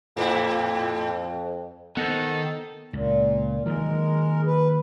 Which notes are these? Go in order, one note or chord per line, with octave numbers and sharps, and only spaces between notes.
F2 A2 E4
D#3 B3 A4 C5 D#5 F#5
C#2 A#2
D#3 F#3 G#3 A#3 A#4
B4